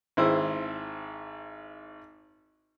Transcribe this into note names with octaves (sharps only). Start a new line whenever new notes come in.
G#1 E4 C5 E6